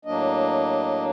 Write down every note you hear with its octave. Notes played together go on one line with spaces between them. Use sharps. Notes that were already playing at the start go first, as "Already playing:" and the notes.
A2 F#3 A#3 D4 D#5